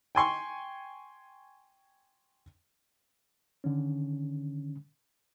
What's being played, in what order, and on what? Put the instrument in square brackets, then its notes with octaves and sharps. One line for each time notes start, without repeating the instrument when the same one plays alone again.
[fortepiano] G5 G#5 C6 C#6
[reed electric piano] D3 D#3 C#4